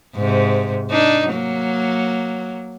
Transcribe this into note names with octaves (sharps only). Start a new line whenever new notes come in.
G#2 C3
D4 D#4
F#3 A#3